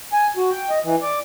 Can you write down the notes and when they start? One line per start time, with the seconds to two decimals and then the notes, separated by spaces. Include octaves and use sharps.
0.13 G#5
0.37 F#4
0.51 G5
0.70 D#5
0.84 E3
1.02 D5